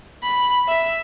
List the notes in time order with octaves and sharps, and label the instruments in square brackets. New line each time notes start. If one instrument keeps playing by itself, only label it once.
[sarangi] B5
E5